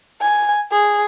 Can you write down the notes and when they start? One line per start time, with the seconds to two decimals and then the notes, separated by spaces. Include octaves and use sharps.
0.21 G#5
0.72 G#4